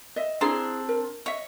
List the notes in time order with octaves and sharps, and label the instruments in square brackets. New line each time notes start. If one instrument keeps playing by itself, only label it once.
[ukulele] D#5 E5
[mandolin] C4 D4 C6 [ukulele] E4 G#4 A#5
[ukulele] A#4
[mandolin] C#5 [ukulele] D#5 E5